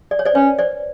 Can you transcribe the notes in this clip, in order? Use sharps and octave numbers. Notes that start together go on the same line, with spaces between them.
D5
C#5
C5 D5
C#4 B4 C#5
C5 D5